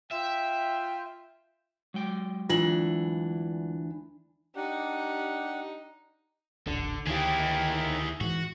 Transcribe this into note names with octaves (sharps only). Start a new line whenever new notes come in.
F4 E5 G5
F#3 G#3 G5
D2 E3 D4 F4 F#7
D4 D#4 G4 F#5
D#1 A1 D3 D4
D2 D#3 E4 G4 G#4
G#2 E3 F#4